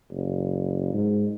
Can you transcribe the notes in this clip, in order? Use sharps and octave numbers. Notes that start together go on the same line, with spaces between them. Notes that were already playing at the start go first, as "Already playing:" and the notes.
F#1
G#2